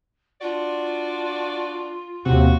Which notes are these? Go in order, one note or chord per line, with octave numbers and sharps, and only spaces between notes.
D4 F4 F#4 D5
D#2 C3 F#3 F#4